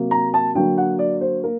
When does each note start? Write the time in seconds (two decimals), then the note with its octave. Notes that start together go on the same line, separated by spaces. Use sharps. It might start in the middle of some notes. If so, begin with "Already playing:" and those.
Already playing: C3 F#3 A#3
0.11 A#5
0.34 A5
0.55 D3 F#3 A#3 G5
0.78 F#5
0.99 D5
1.21 C5
1.44 A#3 A#4